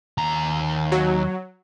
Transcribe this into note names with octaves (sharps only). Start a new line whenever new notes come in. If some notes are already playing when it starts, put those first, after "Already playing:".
D#2 A#5
F#3